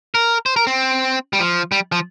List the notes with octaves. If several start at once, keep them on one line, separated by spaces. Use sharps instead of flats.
A#4
C5
A#4
C4
G3
F3
G3
F3